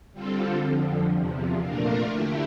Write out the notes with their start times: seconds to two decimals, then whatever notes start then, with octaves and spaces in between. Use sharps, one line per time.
0.13 D3 G3 C4 F4 A4
0.63 F2 D3 F3
1.13 E2 C3 F3
1.61 A#2 A3 D4 F4 A#4
2.11 D3 A3 E4 G4